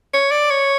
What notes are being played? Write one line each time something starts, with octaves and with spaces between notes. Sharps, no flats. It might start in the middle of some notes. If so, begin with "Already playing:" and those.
C#5
D5
C#5